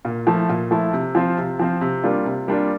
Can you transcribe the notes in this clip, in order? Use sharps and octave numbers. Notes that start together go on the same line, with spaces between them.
A#2
F3 A3 E4
A#2
F3 A3 E4
C3
F3 C4 F4
C3
F3 C4 F4
C3
G3 A#3 D4 F4
C3
G3 A#3 D4 F4